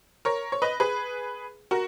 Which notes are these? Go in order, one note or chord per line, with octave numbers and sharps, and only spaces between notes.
A#4 C#5
C#5
B4 D#5
G#4 B4
F#4 A#4